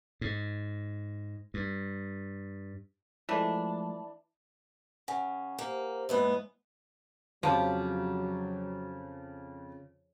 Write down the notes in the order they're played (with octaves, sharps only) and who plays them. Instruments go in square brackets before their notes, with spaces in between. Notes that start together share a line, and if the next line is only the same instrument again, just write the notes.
[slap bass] G#2
G2
[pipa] E3 D4 [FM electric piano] F3 G#3 A3
[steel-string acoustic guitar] C#3 [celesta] F#5 G#5
[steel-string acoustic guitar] A#3 [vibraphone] G4 C5
[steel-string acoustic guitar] E2 G#2 B3 [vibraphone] G#3 A#3
[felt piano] F2 [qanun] C#3 G4 [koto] F3 [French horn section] F#3